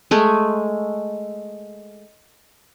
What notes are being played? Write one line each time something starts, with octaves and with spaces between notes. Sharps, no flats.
G#3 A3 G#4